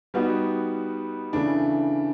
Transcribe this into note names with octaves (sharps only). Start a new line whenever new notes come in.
G3 B3 D#4 F#4
C#3 E3 A3 D4